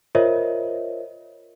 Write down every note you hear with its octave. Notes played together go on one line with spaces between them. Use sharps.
F4 A#4 C5 C#5 D#5 E5